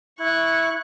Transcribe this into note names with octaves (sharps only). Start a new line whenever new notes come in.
E4 C#6 F#6